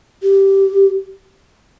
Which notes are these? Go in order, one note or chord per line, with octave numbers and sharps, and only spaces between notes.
G4